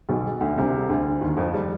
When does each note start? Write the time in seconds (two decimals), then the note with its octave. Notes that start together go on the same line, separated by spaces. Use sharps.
0.09 B1 B2
0.41 D2 D3
0.58 C2 C3
0.89 D2 D3
1.21 D#2 D#3
1.37 F2 F3
1.54 G3